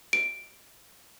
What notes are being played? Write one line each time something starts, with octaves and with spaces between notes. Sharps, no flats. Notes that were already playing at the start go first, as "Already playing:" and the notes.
D7